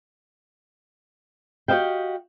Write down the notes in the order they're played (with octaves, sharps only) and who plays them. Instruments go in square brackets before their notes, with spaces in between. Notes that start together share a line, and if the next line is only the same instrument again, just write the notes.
[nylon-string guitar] F#4 G4 C5 D#5 F5 G5